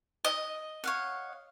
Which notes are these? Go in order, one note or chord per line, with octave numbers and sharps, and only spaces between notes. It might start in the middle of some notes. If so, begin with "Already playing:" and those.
D#5
C#5 F5 F#5